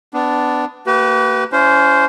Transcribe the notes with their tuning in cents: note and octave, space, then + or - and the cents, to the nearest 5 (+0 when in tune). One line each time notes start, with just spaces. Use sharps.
B3 +25 D4 +0
A#3 -35 G4 -45 B4 +0
C#4 +25 E4 +30 C5 -10